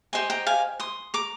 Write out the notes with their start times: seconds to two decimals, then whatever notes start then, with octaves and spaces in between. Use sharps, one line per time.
0.13 G4 C5 D#5 G#5 C6
0.30 G5 A#5
0.47 F5 G#5
0.80 C6 D#6
1.14 A#5 D6